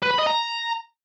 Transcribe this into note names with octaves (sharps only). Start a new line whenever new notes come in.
B4
B5
D#5
A#5